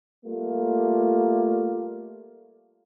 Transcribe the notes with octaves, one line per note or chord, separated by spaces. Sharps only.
G3 A3 A#3 F4